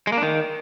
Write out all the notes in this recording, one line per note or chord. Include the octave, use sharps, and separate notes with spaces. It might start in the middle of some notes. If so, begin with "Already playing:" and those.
G#3
A#3
D4
D#3